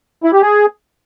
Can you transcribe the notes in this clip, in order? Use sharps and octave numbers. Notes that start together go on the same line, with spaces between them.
E4
G4
G#4